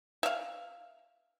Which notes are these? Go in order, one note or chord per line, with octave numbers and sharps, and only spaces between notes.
E5 F5